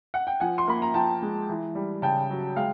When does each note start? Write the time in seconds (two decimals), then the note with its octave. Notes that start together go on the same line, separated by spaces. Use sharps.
0.14 F#5
0.27 G5
0.40 F3 F#5 G#5
0.58 C6
0.68 A#3 B5
0.82 A#5
0.94 F3 G5 A5
1.22 G#3
1.49 E3
1.75 G3
2.02 C#3 G5 A5
2.30 F#3
2.56 G#3 F5 G5